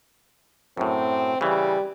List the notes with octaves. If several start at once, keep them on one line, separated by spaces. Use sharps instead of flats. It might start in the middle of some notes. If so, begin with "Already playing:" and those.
F#2 A2 C4
C#3 E3 G3